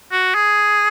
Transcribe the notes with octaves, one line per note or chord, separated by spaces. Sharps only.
F#4
G#4